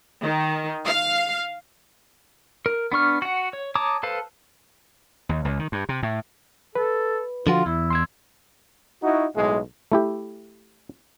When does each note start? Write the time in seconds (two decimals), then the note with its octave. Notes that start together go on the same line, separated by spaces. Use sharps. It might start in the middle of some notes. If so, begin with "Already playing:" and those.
0.22 D#3
0.85 F5
2.66 A#4
2.92 B3 D4 C#6 F6
3.22 F#4 F#5
3.53 C#5
3.75 C#5 A5 A#5 D6 D#6
4.03 A4 B4 C5 F5 A5
5.29 D#2
5.45 C#2
5.59 D#3
5.72 G2
5.89 C3
6.03 A2
6.75 A4 B4
7.47 D3 F3 F4 F#4
7.66 E2 E4
7.90 C6 E6 G#6
9.03 D#4 E4 F#4
9.35 B1 A2 G#3
9.92 A3 E4 G4